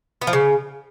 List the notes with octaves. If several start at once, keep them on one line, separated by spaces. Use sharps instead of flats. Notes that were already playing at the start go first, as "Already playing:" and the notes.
B3
F3
C#3